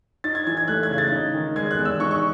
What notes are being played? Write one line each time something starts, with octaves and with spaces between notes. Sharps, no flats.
D#4 A6
G#6
E3 G#6
G#6
A3 F#6
G#6
C#3
A6
D#4
D#3
G#3 G#6
F#6
E2
E6
D#4 C#6
C#6